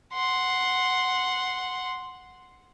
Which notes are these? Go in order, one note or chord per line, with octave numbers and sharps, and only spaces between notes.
F#5 C6